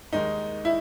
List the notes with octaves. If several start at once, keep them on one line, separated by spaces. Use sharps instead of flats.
D#2 D#3 G#3 D#4
E4